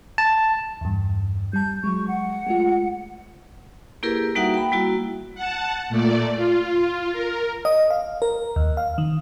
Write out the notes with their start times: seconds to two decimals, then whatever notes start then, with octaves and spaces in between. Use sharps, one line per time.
0.18 A5
0.81 E2 G2
1.53 G3 A5 G6
1.84 F#3 G#3 C#6
2.08 F#5
2.47 G#3 A3 F4
4.03 A#3 E4 G4 G#4 A#4 B4
4.35 G3 A#3 D#4 F#4 E5 F#5
4.54 G5 B5
4.72 G3 A#3 E4 F#4
5.35 F#5 A5
5.89 A#2 A3 D5
6.36 F4
7.13 A#4
7.65 D#5
7.90 F5
8.22 A#4
8.56 D#2
8.77 F5
8.98 D#3